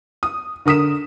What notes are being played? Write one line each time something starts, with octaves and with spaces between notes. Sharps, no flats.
D#6
D3 A#4 D#6 B6 E7